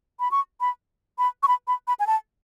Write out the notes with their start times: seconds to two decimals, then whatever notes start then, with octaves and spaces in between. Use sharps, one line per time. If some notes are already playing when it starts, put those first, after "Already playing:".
0.20 B5
0.31 C#6
0.61 B5
1.18 B5
1.43 C#6
1.48 B5
1.68 B5
1.88 B5
2.00 G#5
2.07 A5